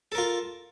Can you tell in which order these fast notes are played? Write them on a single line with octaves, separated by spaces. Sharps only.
A4 A#4 F4